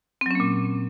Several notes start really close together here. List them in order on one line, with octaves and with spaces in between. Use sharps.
C4 F#3 C#4 A#3 A#2